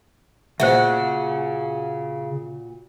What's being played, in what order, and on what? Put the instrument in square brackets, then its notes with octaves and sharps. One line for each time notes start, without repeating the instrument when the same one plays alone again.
[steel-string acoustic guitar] A#2 F#4 [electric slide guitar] C#3 G#4 [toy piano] C5 E5